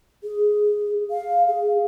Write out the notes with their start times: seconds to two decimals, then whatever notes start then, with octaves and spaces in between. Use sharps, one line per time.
0.23 G#4
1.11 F5
1.48 G#4